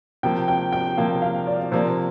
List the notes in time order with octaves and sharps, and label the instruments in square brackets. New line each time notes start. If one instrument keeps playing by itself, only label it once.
[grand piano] C3 F3 A#3 [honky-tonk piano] G5
[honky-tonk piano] G5
G5
[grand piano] C3 F3 A#3 [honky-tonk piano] F5
[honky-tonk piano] F5
D5
[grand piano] C3 F3 A#3 [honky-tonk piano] C5